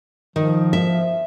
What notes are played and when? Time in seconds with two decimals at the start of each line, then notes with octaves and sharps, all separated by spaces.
0.36 D#3 F3
0.73 E5